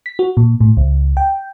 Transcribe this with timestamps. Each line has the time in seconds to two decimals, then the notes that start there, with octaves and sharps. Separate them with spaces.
0.06 B6
0.19 F#4
0.37 A#2
0.61 A2
0.77 C#2
1.17 G5